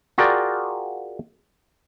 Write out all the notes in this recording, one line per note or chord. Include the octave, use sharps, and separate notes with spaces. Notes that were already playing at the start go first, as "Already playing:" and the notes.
F4 F#4 G#4 A#4 D5 G5